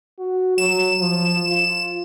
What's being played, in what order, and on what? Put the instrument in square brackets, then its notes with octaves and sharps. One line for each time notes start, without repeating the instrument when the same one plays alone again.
[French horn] F#4
[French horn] F#3 [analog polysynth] E7
[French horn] F3
F4